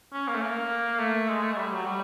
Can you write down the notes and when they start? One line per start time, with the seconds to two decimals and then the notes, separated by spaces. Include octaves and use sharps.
0.13 C#4
0.28 A#3
0.34 A3
0.42 A#3
0.99 A3
1.29 G#3
1.43 A3
1.53 G#3
1.58 G3
1.72 F#3
1.86 G3